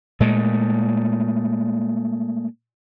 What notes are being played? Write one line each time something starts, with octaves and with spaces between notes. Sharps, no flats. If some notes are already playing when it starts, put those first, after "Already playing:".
A#2 G#3 A3